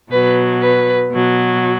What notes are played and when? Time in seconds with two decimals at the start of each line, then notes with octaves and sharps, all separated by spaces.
0.11 B2 F#3 B4
0.61 B4
1.10 B2 F#3